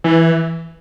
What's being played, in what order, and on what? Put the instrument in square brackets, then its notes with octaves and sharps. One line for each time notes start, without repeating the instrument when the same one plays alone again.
[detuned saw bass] E3